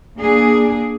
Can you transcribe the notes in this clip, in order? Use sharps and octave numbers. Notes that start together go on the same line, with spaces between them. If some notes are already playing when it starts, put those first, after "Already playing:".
A#3 D4 G#4